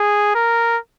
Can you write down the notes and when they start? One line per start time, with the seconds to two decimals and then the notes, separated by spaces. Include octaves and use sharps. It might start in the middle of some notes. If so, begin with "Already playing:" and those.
Already playing: G#4
0.35 A#4